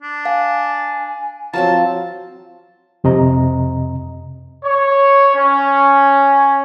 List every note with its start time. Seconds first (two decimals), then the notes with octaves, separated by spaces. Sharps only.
0.02 D4
0.25 F5 G#5
1.53 F3 F#3 C4 A5 A#5
3.04 F2 C3 D#5 A#5
4.63 C#5
5.34 C#4